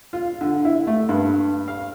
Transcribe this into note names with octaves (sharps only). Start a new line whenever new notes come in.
F4
D3
E4
A3
G2
F5